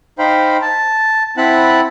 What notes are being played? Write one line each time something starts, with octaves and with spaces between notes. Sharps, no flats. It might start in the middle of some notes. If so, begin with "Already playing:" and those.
D#4 C5 F5 G5 B5
A5
C4 E4 F#5 A5 B5 F#6